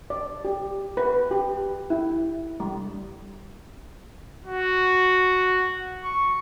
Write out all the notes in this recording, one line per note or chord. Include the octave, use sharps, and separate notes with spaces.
D5
G4
B4
G4
E4
G3
F#4
C#6